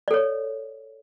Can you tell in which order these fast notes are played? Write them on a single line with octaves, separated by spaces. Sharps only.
D5 A4 C#5